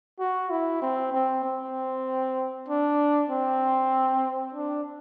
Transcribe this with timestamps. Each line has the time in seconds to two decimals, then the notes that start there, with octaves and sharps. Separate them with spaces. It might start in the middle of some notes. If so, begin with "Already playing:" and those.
0.20 F#4
0.50 E4
0.82 C4
1.13 C4
1.44 C4
2.68 D4
3.30 C4
4.54 D4